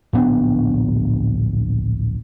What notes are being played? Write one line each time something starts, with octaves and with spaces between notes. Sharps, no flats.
D1 A#1 B3 D4